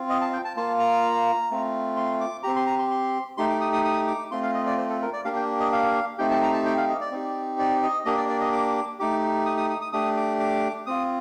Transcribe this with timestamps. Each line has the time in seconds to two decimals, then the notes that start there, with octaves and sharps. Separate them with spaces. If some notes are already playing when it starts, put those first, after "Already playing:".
Already playing: C4 F4
0.09 D#5
0.21 A5
0.33 G5
0.45 A5
0.56 A#3 F4 A5
0.80 A#5
1.51 A3 C4 F4
1.97 C6
2.21 D6
2.43 C4 G4 A#5
2.56 C6
2.67 A#5
2.79 C6
2.91 C6
3.37 A3 D#4 G4 C6
3.49 D6
3.61 D#6
3.73 D#6
3.84 D#6
4.07 D6
4.31 A3 C4 F4 C6
4.43 F5
4.54 D#5
4.66 D5
4.78 C5
4.89 A4
5.02 A#4
5.13 D5
5.25 A#3 D4 G4 F5
5.36 G5
5.60 D#5
5.72 F5
6.18 A3 C4 D#4 G4 G5
6.30 A5
6.42 A#5
6.53 A5
6.66 G5
6.77 F5
6.89 D#5
7.01 D5
7.12 C4 D#4 G4
7.59 D5
7.83 D#5
8.05 A#3 D4 G4 D#5
8.17 D5
8.29 D5
8.41 D#5
8.52 D6
8.99 A3 D#4 G4 D6
9.46 D#6
9.57 D#6
9.70 D#6
9.81 D#6
9.93 A3 D4 G4 D#6
10.17 D6
10.40 D6
10.86 C4 F4 D#6